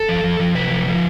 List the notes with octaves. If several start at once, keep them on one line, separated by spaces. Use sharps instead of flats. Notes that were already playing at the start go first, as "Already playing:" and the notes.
Already playing: A4
F3
F3
F3
C3 B4
F3
F3